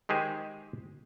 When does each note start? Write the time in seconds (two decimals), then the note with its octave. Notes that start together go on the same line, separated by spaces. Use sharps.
0.09 D#3 G#3 G4 G#4 C5